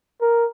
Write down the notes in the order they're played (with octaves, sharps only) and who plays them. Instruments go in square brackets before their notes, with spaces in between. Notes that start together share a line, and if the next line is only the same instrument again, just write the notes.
[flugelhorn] A#4